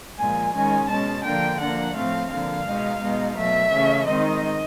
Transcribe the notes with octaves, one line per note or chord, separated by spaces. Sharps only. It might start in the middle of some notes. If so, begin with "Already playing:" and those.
A#2 F3 G#3 G#5
D#3 G#3 C#4 G#5
B2 G#3 C#4 A5
D3 F3 A#3 D4 G5
F3 A#3 D4 F#5
A2 F3 A3 C4 F5
D3 F3 A#3 F5
B2 G#3 B3 D#4
B2 G#3 B3 D#4
B2 F#3 A3 E5
C#3 E3 A3 C#4
D#3 G#3 C4 D#4 D#5